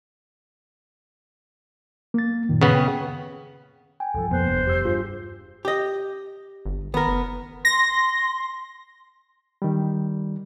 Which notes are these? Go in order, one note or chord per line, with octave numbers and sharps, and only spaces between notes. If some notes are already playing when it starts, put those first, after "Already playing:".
A#3 A6
F#2 A#2 D#3
C#3 B3
G5
G5 G#5
C2 G2 F3 A4
F2 B2 A#3 B3 B4 C5 F#6
F1 E2 G2
G4 E6
G2 F4 G#4
G4 D#5
G1
D#3 B3 A#4
F#1
C6 A#6
D#3 G3